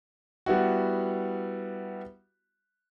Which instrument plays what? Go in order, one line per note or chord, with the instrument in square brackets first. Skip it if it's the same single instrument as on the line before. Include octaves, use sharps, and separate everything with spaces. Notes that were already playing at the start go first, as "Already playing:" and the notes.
[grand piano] G3 B3 E4 F#4